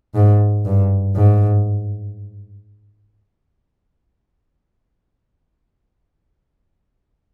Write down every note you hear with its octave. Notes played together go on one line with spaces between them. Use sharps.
G#2
G2
G#2